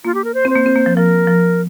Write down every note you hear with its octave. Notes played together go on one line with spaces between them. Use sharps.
A#3 F4
G4
A#4
C5
C4
C5
A#3
C4
A#3
F3
F3 A#4
F3